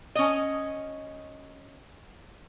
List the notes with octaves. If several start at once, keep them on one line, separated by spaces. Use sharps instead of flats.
C#4 D#5